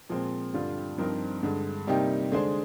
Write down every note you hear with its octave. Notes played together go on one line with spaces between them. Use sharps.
A#2 F3 G#3 C4
G2 D3 G3 D4 F4
G2 F3 C4 D#4 A#4
G2 D3 G#3
C3 G3 A#3 D#4 G4
D3 G#3 D4 G#4 C5